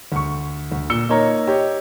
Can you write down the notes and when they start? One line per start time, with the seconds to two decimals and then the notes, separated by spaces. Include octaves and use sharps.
0.12 D2 C#6
0.72 D2
0.90 A#2 E6 C#7 G7
1.09 A#3 D#4 A#4 C#5 A#5
1.47 G4 C#5 D#5